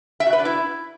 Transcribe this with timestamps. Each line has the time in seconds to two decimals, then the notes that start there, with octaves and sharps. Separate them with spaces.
0.20 E5
0.26 F#4
0.33 B4
0.39 D4
0.45 E4